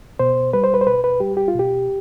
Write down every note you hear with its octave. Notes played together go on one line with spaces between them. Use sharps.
B2 C5
G3 B4
C5
B4
C5
B2 B4
B4
G3 G4
G4
F4
B2
G4